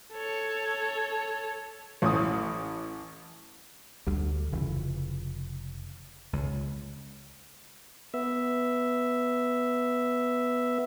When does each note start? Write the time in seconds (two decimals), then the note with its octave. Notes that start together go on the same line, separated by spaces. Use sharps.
0.14 A4 C#5
2.02 A1 A2 E3 D#6
4.07 D2 D3 G3
4.52 F1 C#3 E3
6.33 C#2
8.14 B3 E5